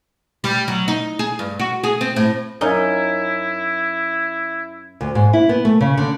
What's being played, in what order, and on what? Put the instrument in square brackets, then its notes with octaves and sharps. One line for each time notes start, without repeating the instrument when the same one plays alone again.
[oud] G3
F#3
D#4
G#4
G2
F#4
G#4
C4
A2
[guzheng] F#2 C#4 D#4 [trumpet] E4
[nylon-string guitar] D2
G#2
E4
B3
A3
C#3
D3